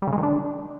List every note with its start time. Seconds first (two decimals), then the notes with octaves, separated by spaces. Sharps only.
0.02 G3
0.07 C#3
0.13 G#3
0.18 D#3
0.23 D4